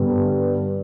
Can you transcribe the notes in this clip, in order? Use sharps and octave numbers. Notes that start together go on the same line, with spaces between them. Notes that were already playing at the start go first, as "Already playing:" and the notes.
Already playing: G2 D3 G3 B3